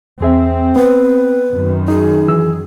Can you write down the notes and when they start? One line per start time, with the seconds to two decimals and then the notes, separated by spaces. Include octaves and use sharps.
0.21 E2 C4 G#4 E5
0.76 B3 B4
1.52 F#2 D#3
1.88 D#4 G#4
2.28 E3 E6